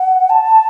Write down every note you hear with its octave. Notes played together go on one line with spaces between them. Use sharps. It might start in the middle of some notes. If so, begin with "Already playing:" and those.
Already playing: F#5
A5